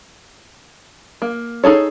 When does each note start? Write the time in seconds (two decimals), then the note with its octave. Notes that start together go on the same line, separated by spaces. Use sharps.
1.22 A#3
1.64 D#4 G#4 A4 C#5